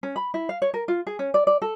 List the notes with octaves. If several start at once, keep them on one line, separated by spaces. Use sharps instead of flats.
C#4
B5
E4
F5
C#5
A#4
F4
G#4
C#4
D5
D5
A4